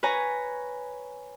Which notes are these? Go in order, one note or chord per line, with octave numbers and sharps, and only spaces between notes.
B4 C#5 G#5 A#5